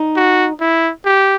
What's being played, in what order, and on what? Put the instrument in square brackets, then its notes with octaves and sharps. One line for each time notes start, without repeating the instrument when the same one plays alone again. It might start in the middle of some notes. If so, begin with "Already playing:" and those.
Already playing: [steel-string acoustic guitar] D#4
[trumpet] F#4
E4
G4